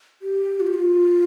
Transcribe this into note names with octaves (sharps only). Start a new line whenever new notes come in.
G4
F4
G4
F4